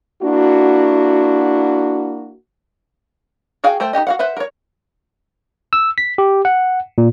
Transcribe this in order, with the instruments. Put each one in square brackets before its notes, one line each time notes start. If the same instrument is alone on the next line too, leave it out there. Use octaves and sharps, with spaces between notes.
[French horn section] A#3 D4 E4 F#4
[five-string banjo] F#4 G#4 F5 G5
A3 C5 G5
D#4 F#4 G4 D#5
F#4 F5 F#5
B4 C5 E5 F#5
A#4 C#5
[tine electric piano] E6
B6
G4
F#5
A#2